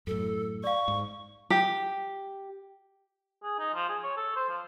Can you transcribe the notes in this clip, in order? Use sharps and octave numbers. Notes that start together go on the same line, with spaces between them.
F#2 A2 A4
D5 F5 C#6
G#2
G4
G#4
D#4
F3
G#4
C#5
A4
C5
F3